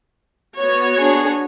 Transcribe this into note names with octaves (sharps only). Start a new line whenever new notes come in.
B3 F#4 C#5
D4 G#4